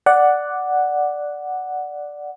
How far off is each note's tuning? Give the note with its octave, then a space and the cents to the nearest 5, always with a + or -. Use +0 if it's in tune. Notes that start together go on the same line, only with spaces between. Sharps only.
D5 +0 F#5 +0